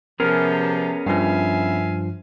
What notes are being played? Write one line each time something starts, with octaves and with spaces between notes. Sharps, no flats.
C3 F3 B3 C#4 G#4 A#4
G2 F3 E5 F5 G#5